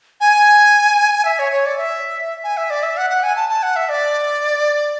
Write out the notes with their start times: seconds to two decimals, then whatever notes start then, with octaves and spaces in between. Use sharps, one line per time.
0.21 G#5
1.25 E5
1.39 C#5
1.52 C#5
1.66 D5
1.78 E5
2.44 G#5
2.57 E5
2.70 D5
2.83 E5
2.97 F#5
3.10 F#5
3.23 G#5
3.36 A5
3.49 A5
3.63 F#5
3.76 E5
3.89 D5